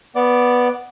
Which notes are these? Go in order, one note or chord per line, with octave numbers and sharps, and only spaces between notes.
B3 D5